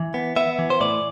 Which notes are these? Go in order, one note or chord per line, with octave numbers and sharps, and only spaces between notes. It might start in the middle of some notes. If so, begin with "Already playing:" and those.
Already playing: E3
B3
B3 E5
E3
C5
A2 D5